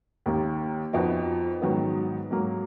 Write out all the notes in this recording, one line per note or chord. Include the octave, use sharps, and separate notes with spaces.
D#2 D#3 A#3
F2 F3 B3 D#4 F#4
G#2 D#3 F#3 B3
G#2 F#3 A#3